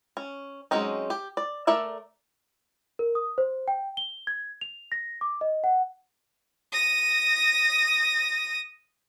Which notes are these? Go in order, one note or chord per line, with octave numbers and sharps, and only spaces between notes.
C#4
F#3 G#3 C4 C#4 D#4
G4
D5
A3 A4 A#4 D5 E5
A#4
D#6
C5
G5
G7
G#6
F7
A#6
D6
D#5
F#5
D#6 A#6